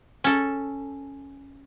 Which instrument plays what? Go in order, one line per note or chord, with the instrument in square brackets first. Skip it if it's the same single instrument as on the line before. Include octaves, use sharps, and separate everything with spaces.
[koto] C#4 A4